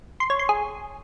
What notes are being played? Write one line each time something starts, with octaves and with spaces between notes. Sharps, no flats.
C6
C#5
C6
G#4